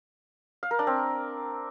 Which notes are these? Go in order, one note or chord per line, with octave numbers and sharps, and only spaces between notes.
F5
A#4
D4
C4